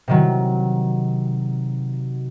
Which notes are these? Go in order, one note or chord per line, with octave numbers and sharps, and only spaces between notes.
C3 D#3 F#3